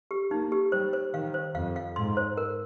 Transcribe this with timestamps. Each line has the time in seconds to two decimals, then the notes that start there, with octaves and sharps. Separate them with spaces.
0.11 G4
0.30 A#3 D#4
0.52 G4
0.72 G3 C5
0.93 C5
1.13 D#3 F5
1.34 C5
1.55 F2 F5
1.76 F5
1.96 G#2 C6
2.17 C5
2.37 A#4